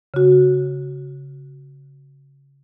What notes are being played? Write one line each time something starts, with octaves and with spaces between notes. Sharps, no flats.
C#3 F#4